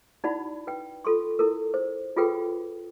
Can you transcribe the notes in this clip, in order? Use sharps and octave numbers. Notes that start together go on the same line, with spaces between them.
D#4 E4 F#4 D5 F#5 B5
B4 G5
F4 A4 C6 C#6
E4 A4 A#4
C5
F4 F#4 G#4 A4 B4 G5